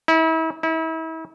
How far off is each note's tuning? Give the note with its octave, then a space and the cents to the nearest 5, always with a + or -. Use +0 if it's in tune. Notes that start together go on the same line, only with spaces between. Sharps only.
E4 -35
E4 -35